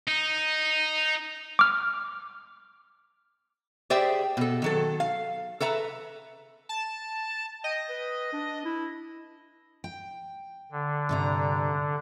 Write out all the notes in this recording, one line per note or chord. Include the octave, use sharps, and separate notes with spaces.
D#4
D6 F6
G4 G#4 C5 D5 E5 G5
B2 A4
D#3 F#3 A4
F5
A4 B4 E5 A#5
A5
D#5 G5
B4
D4
E4
G5
D3
G2 C3 A#5